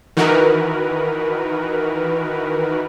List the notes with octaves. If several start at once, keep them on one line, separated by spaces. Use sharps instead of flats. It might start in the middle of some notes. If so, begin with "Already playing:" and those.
D#3 E3 D#4 F#4 A#4 B4